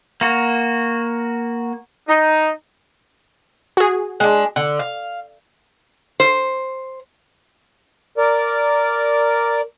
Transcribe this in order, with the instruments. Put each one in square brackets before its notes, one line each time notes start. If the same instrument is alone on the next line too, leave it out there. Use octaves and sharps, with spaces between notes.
[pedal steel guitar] A#3 F#4
[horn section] D#4
[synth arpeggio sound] F#4 G#4
[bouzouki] G#3 D4
D3
F5
[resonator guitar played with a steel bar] C5
[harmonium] A#4 D5